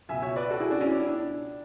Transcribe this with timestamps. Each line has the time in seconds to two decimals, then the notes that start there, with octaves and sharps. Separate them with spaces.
0.09 C#2 B2 E5 G#5
0.22 C#5 E5
0.36 B4 D5
0.50 F#4 A4
0.60 E4 G#4
0.71 D4 F#4
0.80 C#4 E4
0.91 D4
1.00 E4
1.09 D4